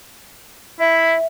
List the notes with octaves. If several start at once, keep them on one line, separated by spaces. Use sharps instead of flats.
E4 E5